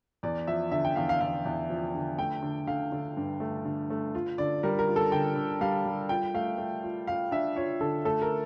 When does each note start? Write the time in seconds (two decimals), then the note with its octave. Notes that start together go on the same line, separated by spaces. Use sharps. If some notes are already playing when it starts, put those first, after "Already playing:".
0.23 E2 D5
0.47 F3 E5
0.71 D3 E5
0.85 G5
0.96 E2 F5
1.09 F5
1.21 E2 F5
1.45 E2
1.70 F3
1.95 D3
2.18 A3 G5
2.42 D3
2.67 D3 F5
2.92 D3
3.17 G2
3.40 A3
3.65 D3
3.90 A3
4.15 F4
4.38 D3 D5
4.63 G3 A#4
4.79 A#4
4.88 F4
4.96 A4
5.12 D3 G5
5.36 D3
5.61 G3 F5
5.85 G3
6.09 F4 G5
6.34 A3 F5
6.58 A3
6.83 F4
7.07 F4 F5
7.31 D4 E5
7.56 F4 C#5
7.80 D3 A4
8.05 A3 A4
8.22 A#4